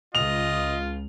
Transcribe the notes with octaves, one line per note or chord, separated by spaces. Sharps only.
C#2 F4 D#5 F7